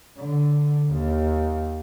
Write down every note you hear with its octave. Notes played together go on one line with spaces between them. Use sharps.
D3
D#2